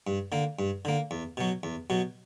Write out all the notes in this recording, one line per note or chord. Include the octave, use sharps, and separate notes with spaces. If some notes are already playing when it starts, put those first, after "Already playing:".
G2
D3 A#3
G2
D3 A#3
E2
B2 F#3
E2
B2 F#3